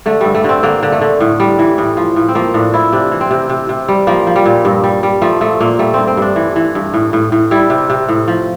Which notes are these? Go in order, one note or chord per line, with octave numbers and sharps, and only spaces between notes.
D3 A3
G2 G3
A3
D3 C4
D3 A#3
D3
A3
D3
A2
G3
E3
A2
F3
A2
C4
F3 A#3
A2 D4
F3 E4
C3 D4
E3
C4
C3
C3
C3
G3
F3 A#3
F3
G3
A#2
G2
G3
G3
F3 A3
A#2 A3
A#2 A#3
G3 A3
G2 C4
C4
G2 D4
E3
E3
G2
A2
A2
A2
G3 E4
C3
C3
A2
F3